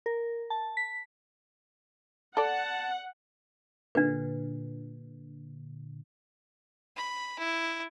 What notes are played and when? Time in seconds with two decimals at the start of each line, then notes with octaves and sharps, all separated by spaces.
0.06 A#4
0.50 A5
0.77 B6
2.37 A4 D5 F#5 A5
3.95 A#2 D3 D4 B4
6.96 B5
7.39 E4